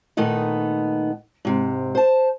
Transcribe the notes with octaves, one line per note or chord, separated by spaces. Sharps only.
A#2 D#3 A3 B3 D#4
G#2 C3
C5 A5